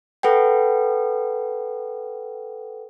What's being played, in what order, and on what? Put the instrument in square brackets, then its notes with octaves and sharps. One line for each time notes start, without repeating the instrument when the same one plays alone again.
[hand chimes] A4 B4 F#5 G5